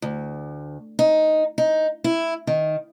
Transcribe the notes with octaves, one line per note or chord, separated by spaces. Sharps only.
D2
D#4
D#4
E4
D#3